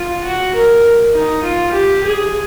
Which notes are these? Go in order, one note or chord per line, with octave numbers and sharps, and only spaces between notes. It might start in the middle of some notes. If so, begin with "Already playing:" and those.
Already playing: F4
F#4
A#4
D#4
F4
G4
G#4